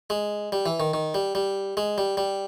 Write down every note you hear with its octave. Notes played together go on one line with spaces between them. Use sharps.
G#3
G3
E3
D#3
D#3
G3
G3
G#3
G3
G3